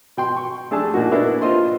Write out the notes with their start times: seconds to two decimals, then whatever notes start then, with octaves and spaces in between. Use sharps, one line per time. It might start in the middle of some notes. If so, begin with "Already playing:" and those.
0.17 B2 G5 C6
0.37 C#6
0.71 A3 D4 G#4 A4 A5
0.94 A#2 A#3 D#4 F#4
1.12 A#3 B3 D4 E4
1.42 F4 C5 D#5 C6